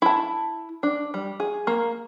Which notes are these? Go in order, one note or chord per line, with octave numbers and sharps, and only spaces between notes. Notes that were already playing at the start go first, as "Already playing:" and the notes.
E4 A5
D4
G3
G#4
A#3